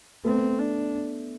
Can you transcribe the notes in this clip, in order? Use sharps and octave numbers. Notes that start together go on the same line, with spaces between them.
A3 B3 C4
D4